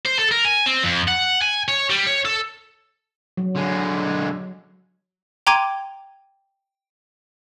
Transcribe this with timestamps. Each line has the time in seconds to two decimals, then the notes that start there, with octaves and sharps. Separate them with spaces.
0.05 C5
0.19 A4
0.31 A#4
0.45 G#5
0.66 C4
0.83 F2
1.08 F#5
1.42 G#5
1.68 C#5
1.90 G3
2.07 C#5
2.25 A4
3.37 F#3
3.56 D3 G#3
5.47 G5 A#5 C6 D6 G#6 D#7